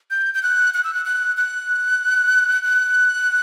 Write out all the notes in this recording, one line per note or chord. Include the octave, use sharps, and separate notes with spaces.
G6
G6
F#6
F#6
E6
F#6
F#6
F#6
F#6